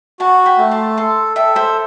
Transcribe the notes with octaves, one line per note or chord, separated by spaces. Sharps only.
F#4 F#5 A5
G5 B5
A3
A5 C6
A4 A5 C6
A4 E5 G5
C5 E5